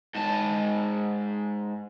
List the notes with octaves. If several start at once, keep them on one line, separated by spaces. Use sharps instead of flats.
G#2 A5